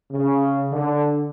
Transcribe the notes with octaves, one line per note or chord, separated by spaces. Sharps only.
C#3
D3